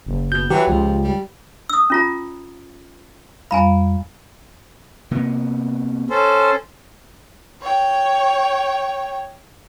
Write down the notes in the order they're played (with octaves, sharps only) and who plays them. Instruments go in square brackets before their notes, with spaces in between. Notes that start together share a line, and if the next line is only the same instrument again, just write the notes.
[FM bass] F#1
[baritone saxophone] B2 [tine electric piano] G6
[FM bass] E3 [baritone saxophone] F#3 [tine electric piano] G4
[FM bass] C#2 [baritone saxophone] F3
[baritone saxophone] G3
[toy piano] D#6 E6
C#4 F4 A#5
[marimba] F2 G3 F5 [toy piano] G#5 A#5 B5
[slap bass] C3 A#3 B3
[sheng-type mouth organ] C#4 A4 C5
[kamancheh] C#5 G5